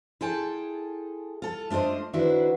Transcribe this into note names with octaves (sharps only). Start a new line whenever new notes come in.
E4 F4 G#4 A4 G5 A5
F4 A4
A3 D4 F4 C5 D#5
D#3 D4 E4 F#4 B4 C5